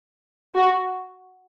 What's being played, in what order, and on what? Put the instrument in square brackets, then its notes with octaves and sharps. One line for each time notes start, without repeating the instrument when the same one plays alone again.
[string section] F#4